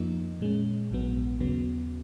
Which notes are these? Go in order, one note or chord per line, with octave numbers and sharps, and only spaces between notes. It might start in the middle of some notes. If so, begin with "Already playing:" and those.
Already playing: F2 F3 A#3 D#4
A#2 G#3 C#4
A#1 G#2 F#3 B3
D#2 C#3 F#3 B3